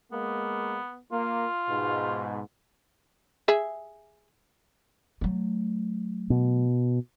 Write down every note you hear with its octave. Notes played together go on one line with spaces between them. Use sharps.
G#3 A#3 B3
A#3 F4
G#2 B2
G#4 E5
F#3 A3
B2